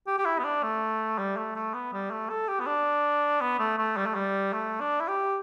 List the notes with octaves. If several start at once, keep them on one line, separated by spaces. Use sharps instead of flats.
G4
G4
E4
B3
D4
A3
G3
A3
A3
B3
G3
A3
A4
G4
B3
D4
B3
A3
A3
G3
A3
G3
A3
D4
E4
G4